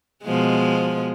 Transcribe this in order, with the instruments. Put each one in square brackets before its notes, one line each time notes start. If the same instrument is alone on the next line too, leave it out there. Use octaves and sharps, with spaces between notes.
[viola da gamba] B2 F3 G#3